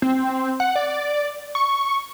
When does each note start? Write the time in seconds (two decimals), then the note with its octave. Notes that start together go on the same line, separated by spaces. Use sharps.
0.02 C4
0.60 F#5
0.76 D5
1.55 C#6